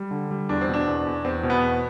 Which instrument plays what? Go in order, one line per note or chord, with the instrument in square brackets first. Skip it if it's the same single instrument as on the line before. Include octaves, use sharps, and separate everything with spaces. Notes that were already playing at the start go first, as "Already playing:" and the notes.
Already playing: [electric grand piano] G3
D3
G3
[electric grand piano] E2 [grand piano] D4
[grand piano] C4
[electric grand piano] B2
[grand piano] D4
[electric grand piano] E2
E2
[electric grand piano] E2 [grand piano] C4
[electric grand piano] B2
[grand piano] B3
[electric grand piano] E2